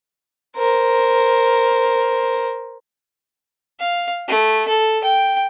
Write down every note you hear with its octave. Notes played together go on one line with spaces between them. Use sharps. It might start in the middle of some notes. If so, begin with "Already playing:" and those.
A#4 C5
F5
A3
A4
G5